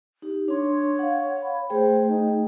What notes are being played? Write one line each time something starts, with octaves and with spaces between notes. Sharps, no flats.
D#4 G4
D4 C#5 C6
F5 F#5
B5
A3 G#4 C5 G5
D#4